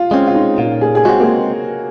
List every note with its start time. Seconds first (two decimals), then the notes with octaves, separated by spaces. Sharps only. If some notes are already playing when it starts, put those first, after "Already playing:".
Already playing: F4
0.11 G#3 C4 C#4
0.27 F4
0.35 D#4
0.58 A#2 F4
0.81 G#4
0.95 G#4
1.05 G#3 C4 F#4
1.20 A#3